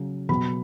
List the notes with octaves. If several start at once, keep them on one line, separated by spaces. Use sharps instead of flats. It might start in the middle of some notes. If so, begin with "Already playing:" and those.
Already playing: C#3 F#3
B2 F#3 B5